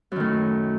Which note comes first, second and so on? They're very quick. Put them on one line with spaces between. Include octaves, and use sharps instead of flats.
F#2 D#3 A2